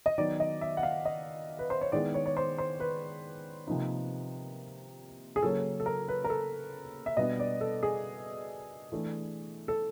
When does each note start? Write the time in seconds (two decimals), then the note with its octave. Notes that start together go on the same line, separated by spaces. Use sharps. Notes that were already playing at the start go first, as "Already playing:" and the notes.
0.06 D#5
0.18 D#3 F#3 B3 D#4 D5
0.40 D#5
0.61 E5
0.77 F#5
0.83 F5
1.05 D#5
1.59 B4
1.70 C5
1.81 C#5
1.92 D#3 G#3 B3 E4 D5
2.14 C#5
2.26 C#5
2.37 C5
2.58 C5
2.80 B4
3.67 C3 F3 A#3 D#4
5.36 G#4
5.42 C#3 F#3 A#3 C#4 A4
5.80 A4
5.86 A#4
6.08 B4
6.24 A#4
6.30 A4
7.06 E5
7.17 B2 G3 B3 D4 D#5
7.40 D5
7.61 A4
7.83 G#4
8.92 E3 A3 D4
9.68 A4